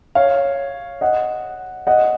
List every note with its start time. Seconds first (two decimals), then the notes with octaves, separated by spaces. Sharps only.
0.15 C#5 F5
1.01 D#5 F#5
1.87 D#5 F#5